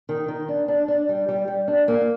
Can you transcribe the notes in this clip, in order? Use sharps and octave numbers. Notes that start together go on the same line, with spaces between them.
D#3
D#3
D4
D4
D4
G3
G3
G3
D4
A#3